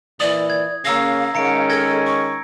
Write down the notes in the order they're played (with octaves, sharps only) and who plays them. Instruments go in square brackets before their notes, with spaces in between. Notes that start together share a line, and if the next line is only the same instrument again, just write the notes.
[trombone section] A#2 E3 [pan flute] D5 [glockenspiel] D#6
[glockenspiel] G#6
[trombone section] C#3 A#3 C#4 [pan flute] F5 [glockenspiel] A#5 E6 A#6
[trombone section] D#3 G#3 C#4 [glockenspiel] A#5 C#7 D7
[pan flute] A4 [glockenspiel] G#6 A#6
[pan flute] C#6